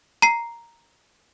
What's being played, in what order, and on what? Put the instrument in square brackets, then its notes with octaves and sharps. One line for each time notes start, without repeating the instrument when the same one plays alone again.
[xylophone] A#5 C7